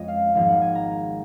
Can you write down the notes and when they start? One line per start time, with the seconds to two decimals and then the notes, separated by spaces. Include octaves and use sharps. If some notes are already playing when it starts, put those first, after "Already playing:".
Already playing: F2 F3 G#3 C#4 C#5 D#5
0.08 F5
0.35 G#1 G#2 F3 A#3 F5
0.48 F#5
0.62 G#5
0.75 A#5